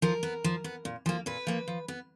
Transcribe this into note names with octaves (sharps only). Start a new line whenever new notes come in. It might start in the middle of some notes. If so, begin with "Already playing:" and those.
F3 A#4
B3
F3
B3
A#2
F3 A#3
A#2 B4
F3 A#3
F3
B3